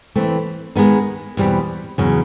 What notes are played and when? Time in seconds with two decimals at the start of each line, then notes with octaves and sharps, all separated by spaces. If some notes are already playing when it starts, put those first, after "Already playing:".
0.16 E3 A3 C4
0.75 D#3 G#3 B3 D#4
1.37 E2 B2 G3 C4
1.98 E2 C#3 F#3